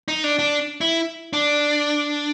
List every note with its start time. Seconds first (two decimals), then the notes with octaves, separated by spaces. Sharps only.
0.08 D#4
0.24 D4
0.39 D4
0.81 E4
1.33 D4